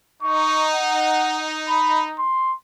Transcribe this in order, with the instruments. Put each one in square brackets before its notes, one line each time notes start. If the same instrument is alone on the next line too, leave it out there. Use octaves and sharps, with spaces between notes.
[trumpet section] D#4 [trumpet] C#6
[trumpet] F#5
B5
C6